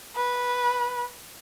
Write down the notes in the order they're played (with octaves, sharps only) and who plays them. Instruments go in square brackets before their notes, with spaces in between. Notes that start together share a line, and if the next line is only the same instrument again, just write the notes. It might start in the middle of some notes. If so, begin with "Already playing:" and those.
[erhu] B4